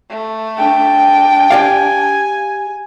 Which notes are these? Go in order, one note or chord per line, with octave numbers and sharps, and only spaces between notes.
A3
D4 G5
G4 D5 F5 G#5